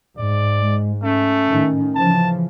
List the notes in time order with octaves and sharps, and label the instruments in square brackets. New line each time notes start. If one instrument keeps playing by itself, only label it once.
[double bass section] G#2 [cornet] D5
[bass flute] G#3
[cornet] A3 [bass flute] C#4
[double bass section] A2 D#3
[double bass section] C#3 E3 F3 [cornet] A5